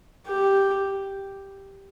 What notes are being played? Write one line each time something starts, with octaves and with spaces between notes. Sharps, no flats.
G4